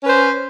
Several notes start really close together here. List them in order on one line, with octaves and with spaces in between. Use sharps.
C#4 B4 C5